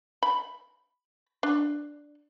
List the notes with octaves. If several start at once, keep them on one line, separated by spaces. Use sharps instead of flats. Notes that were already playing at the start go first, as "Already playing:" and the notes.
B5
D4